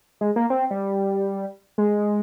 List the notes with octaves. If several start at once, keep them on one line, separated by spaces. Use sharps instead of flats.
G#3
A#3
C4
G3
G#3